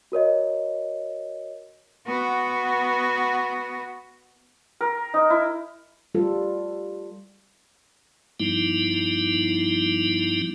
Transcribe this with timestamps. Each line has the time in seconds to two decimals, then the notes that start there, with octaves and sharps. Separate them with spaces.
0.12 F#4 A#4 C#5 D#5
2.06 B3 F#4
4.81 A#4
5.14 D#4
5.30 E4
6.15 G3 F4 A4
8.40 G2 F3 G3 B3 D#4 E4